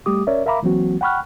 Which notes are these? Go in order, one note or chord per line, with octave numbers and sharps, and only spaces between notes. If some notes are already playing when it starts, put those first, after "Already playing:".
G3 A3 G4 D6 D#6
C#4 A#4 C#5 D5 E5
A#4 E5 F5 A#5 B5 D6
E3 F#3 A#3 C4 F#4
F#5 G5 B5 C#6 F6 F#6